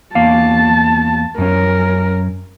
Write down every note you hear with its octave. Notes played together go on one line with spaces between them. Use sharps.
E2 A#3 F5 A5
F#2 C#4 A#4